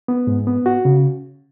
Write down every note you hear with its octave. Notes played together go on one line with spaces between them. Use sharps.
B3
G#2
B3
F#4
C#3